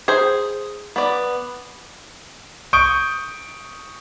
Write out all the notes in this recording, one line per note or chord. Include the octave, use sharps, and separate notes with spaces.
G#4 C5
B3 D5
C#6 D#6 G6 D7